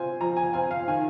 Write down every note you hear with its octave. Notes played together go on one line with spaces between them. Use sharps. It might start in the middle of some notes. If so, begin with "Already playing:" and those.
Already playing: C4 F4 C5 G#5
F3 A#5
G#5
C4 F4 G#5
F5
D#3 G#5